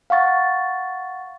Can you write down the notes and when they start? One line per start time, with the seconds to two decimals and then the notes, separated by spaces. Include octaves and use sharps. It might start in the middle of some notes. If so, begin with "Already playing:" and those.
0.10 F5 F#5 C#6 A6